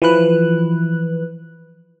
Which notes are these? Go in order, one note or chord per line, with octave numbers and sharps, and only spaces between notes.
E3 F3 B4 F#6